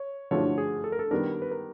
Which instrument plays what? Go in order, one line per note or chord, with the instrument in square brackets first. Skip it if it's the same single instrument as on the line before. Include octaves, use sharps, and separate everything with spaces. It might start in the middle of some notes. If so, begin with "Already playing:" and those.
Already playing: [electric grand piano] C#5
[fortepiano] D3 F3 A3 D4 F#4 [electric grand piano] C#5
[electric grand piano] G#4
A4
A#4
A4
[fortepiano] D#3 G3 B3 D4 [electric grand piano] A#4
[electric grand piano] B4
A#4